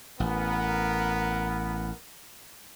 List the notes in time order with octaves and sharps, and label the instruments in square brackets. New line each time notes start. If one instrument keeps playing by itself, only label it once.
[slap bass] A1 [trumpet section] B3 A#4